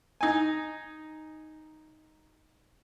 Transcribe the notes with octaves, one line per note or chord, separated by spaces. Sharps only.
D#4 G#5